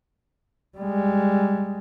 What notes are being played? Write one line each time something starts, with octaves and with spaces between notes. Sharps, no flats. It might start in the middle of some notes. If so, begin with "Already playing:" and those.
G3 G#3